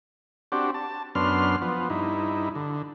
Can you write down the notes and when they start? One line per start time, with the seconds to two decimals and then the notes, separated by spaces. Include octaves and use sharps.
0.52 C4 D4 F#4 G4
0.74 A5
1.15 F#2 B3 D4 C6 F6
1.62 F3 B3
1.90 G2 D#4 E4
2.55 D3